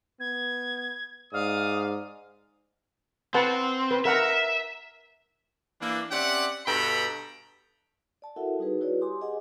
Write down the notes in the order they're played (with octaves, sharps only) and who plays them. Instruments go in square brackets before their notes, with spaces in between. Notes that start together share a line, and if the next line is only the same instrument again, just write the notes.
[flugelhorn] B3 [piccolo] G#6
[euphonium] G#2 [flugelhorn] D5 [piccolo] F5 [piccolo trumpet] D#6
[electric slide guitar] C4 [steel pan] B4 F#5 A5
[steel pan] B4
[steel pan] A#4 F#5 A#5 [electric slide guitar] E5
[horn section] E3 A#3 D4
C4 C#4 G4 D5 E5 F#5
G2 B2 A4 G5 A#5 B5
[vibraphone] D5 A5
E4 F#4 A4 A#4 E5 F#5
G3 D#4 F#4 G#4 B4
E4 F#4 G#4 B4 C#5 D5
G4 G#5 C6 D6 D#6
G4 G#4 D#5 F#5 G#5